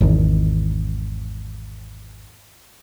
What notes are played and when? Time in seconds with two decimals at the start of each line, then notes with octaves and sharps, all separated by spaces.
0.01 G#1 E2 D#3